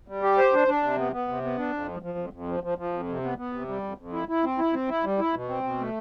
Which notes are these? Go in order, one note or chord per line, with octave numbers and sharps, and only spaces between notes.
G3
G4
C5
D4
D4
C3
B3
B3
C3
B3
D4
F2
F3
F3
F2
F2
F3
F3
F3
F2
C3
B3
B3
C3
G3
F2
F2
E4
E4
C4
E4
C4
E4
G3
E4
B2
C4
B2
A3